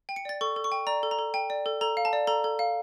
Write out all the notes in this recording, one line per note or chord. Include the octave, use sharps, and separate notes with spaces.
G5
C#7
D5 A6
A4 C#6
A4
C#6
G5
D5 A#5
A4
A#5
A4
G5
D5
A4
A4 A#5
F5
A5
D5
A4 A#5
A4
F5